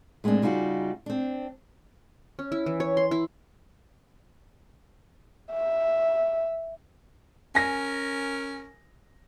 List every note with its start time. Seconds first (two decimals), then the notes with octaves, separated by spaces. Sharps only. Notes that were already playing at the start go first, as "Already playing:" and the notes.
0.24 A2 G#3 A#3 C4 D4
0.42 C#3 G3 D#4 F4 F#4
1.06 C4 D4
2.39 C#4
2.52 E4
2.66 E3
2.80 C#5
2.97 C6
3.11 E4
5.51 E5
7.55 C#4 A#4 G#5 A#6